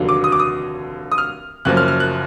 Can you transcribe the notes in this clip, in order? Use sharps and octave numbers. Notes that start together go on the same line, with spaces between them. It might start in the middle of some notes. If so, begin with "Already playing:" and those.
Already playing: F1 D#2 D3 F#3
D6
D#6
D6
D#6
D#6
F6
F#1 F#2 F3 A#3 F#6
F6
F6
F#6